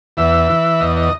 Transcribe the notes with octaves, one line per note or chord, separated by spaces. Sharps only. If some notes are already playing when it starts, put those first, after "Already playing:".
E2 E5
E3
E2 D#5
D#5